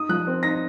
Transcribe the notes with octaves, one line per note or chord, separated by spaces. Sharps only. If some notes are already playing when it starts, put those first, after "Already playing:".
Already playing: D#4 D#6
F3 F#6
C4
D#4 A#6